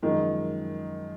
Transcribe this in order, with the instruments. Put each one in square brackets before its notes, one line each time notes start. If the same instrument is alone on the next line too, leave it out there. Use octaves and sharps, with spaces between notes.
[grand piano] F#2 F3 G#3 [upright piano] D#3